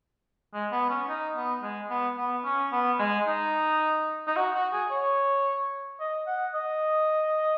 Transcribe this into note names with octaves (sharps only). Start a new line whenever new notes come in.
G#3
B3
C#4
D#4
B3
G#3
B3
B3
C#4
B3
G#3
D#4
D#4
F#4
F#4
G#4
C#5
D#5
F#5
D#5